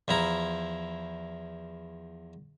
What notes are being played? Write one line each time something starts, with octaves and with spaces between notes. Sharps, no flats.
E2 F3 E4 A#5